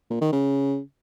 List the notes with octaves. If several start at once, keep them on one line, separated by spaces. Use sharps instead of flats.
A#2
D#3
C#3